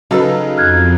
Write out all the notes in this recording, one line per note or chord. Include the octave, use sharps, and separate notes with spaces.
C#3 F#3 D#4 A4 B4 E6
F2 F6 F#6 G#6